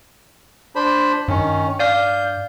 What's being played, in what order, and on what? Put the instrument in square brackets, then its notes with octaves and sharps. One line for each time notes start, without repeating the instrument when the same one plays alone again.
[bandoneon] D4 C5 B5
[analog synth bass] G2 [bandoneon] D#3 C#4
[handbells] D5 F5 F6 [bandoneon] G6